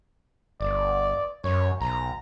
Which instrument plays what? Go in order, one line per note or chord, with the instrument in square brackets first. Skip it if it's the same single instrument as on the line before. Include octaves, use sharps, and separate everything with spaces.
[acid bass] G1 [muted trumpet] D5
[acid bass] F#2 [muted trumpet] C#5
[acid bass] B1 [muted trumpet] A#5